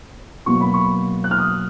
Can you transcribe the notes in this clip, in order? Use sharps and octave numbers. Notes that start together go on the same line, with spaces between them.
B2 F#3 A#3 C#6
B5
C#6
F#6
F6
D#6